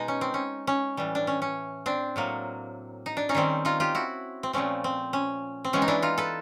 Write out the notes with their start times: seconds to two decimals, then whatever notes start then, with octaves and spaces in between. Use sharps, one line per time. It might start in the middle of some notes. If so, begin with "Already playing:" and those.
Already playing: B2 G#3 D#4
0.08 C#4
0.21 C4
0.34 C#4
0.67 C#4
0.97 A2 E3 G3
1.15 D4
1.27 C#4
1.42 C#4
1.86 C4 D4
2.16 A2 F#3 A#3
3.06 D#4
3.17 D4
3.29 C#4 D#4
3.35 D#3 G3 C4
3.65 D#4 F4
3.80 F4 G4
3.95 E4 F#4
4.43 C4
4.53 A#2 F3 A3 C4 C#4
4.84 C4
5.13 C#4
5.64 C4
5.73 E3 G#3 B3 C#4
5.82 D#4
5.88 D4 E4
6.02 D#4 F4
6.18 A4 B4